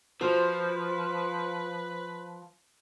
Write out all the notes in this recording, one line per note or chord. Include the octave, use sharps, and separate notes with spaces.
F3 F4 F#4 B4 C5